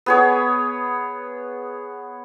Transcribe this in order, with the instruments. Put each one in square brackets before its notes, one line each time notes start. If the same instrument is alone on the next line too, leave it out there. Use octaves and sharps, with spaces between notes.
[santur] B3 G#4 C#5